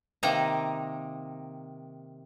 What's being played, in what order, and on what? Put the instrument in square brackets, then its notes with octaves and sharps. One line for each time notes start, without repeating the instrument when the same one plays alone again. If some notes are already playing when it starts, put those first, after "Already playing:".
[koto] C3 D#3 A#3 D#4 A#5